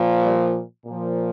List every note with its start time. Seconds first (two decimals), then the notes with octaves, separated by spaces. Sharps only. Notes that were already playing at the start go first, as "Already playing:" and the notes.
Already playing: A#2 F3
0.23 G3
0.86 A#2
0.92 F3